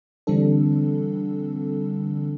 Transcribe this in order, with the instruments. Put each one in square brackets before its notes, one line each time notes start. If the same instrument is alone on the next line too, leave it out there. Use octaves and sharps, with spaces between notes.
[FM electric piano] D3 E3 G3 C4 D4 A4